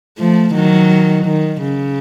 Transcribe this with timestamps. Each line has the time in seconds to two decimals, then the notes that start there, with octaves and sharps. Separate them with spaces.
0.19 F3 A3
0.55 D#3 F#3
1.26 D#3
1.62 C#3